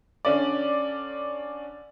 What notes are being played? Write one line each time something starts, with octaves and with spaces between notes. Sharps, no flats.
D3 C#4 D5